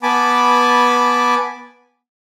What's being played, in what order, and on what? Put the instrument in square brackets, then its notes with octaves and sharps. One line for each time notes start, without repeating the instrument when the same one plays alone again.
[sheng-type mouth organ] B3 G#5 A5 B5 D6